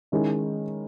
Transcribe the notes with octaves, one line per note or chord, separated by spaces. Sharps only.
D#3 G#3 C#4 E4